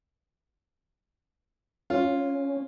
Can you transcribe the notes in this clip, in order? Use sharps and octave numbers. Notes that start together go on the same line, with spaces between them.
C#4 F4